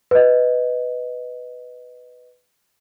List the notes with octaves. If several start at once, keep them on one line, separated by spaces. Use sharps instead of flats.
B4 D#5